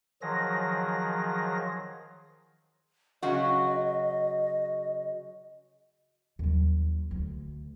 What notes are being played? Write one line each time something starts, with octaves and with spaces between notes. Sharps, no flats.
D#3 F3 F#3 G#4 A#6
C#3 F#3 F#4 D#5
D#2 F#3
D2